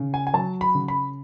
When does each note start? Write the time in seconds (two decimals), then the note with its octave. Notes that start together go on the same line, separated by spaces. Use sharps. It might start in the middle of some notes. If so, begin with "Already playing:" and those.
Already playing: C#3
0.14 G#5
0.27 G#5
0.34 F#3 A5
0.61 B5
0.75 C#3
0.88 B5